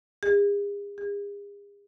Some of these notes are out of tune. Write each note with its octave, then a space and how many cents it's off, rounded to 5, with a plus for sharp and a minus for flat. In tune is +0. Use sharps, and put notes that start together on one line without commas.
G#4 -45
G#4 -45